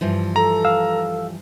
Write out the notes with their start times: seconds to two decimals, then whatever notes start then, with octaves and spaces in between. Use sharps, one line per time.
0.01 G2 E3 F3
0.36 A4 A#5
0.65 F5 E6